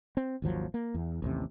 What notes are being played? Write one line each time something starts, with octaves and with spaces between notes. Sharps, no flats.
C4
G#1 D#2 F3 F#3
A#3
E2
A1 D#2 C3